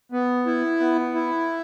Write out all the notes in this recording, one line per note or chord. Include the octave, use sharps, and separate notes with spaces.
B3
E4
B3
E4